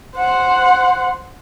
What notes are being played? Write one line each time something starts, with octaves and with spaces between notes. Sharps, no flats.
C5 F#5